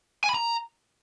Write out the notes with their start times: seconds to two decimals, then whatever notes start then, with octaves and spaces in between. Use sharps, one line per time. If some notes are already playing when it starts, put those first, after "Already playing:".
0.24 G#5
0.29 B5
0.34 A#5